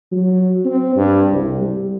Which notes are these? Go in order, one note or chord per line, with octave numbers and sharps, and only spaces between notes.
F#3
C4
G2
C2
G3